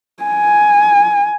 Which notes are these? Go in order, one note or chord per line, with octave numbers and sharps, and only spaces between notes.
G#5